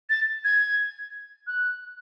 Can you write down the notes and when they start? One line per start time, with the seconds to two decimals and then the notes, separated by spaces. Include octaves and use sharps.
0.10 A6
0.44 G#6
1.47 F#6